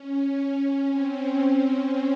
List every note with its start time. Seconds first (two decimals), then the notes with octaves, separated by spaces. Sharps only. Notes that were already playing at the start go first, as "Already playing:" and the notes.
Already playing: C#4
0.33 C#4
0.86 C4